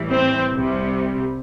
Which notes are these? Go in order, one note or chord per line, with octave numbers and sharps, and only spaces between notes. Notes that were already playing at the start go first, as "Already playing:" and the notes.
Already playing: A2 E3 G3
C4
C2 C3 G3